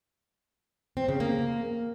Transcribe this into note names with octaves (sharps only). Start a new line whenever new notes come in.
C4
C#3
A#3